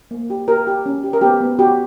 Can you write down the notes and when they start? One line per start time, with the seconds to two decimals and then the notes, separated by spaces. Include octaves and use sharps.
0.11 A#3
0.30 G4
0.48 G4 A#4
0.67 G4
0.86 C#4
1.04 G4
1.13 A#4
1.21 B3 G4
1.41 B3
1.59 F#4 G4